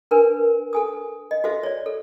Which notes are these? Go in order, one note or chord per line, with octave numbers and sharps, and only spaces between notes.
D4 A#4 B4 G#5
A4 G#5 D#6
D#5
F#4 A4 C5 E5
C#5 D5
A4